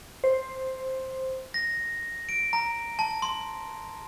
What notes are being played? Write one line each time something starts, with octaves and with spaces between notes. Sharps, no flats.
C5
A#6
D7
A#5
A5
C6